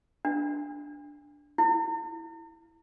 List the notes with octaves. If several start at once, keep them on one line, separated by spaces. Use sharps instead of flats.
D4
E4